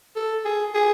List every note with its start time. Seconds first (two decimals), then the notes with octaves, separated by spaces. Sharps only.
0.16 A4
0.45 G#4
0.74 G#4